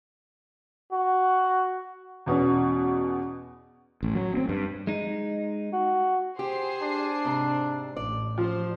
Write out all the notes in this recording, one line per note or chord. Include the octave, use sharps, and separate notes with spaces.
F#4
E2 B2 B3 C#4
A1
F#3
C4
G2
G#3 D#4
F#4
G4 G#4 C5 C7
D4
G#2 C3
A1 D5
F3 C5